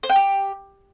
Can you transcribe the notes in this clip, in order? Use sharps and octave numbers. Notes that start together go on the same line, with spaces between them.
C5
G5
G4